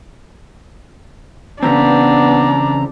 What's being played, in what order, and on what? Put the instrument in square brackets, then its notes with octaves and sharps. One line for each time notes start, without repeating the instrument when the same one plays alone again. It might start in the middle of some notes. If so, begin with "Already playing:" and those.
[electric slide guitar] C#3 E3 C4 [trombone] B3 [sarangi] D4 [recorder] A#5